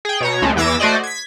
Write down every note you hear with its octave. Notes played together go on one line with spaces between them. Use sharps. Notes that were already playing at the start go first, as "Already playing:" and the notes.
G#4 G5
B2 C#5 A#5
C#2 G#3 A3
E2 E3 D6 E6 G#6 A#6
A3 F#4 C5 D5 D#5
G#6 B6